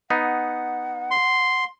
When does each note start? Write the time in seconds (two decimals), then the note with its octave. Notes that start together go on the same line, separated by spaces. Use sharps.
0.10 B3 D#4 F#5
1.11 C6